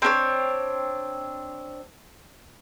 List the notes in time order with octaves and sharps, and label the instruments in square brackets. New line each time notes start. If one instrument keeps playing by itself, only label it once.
[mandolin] C4 D4 A#4 C#5